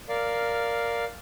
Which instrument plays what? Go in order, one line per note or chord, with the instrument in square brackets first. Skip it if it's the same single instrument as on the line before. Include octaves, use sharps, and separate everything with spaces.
[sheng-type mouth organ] A#4 D5 F5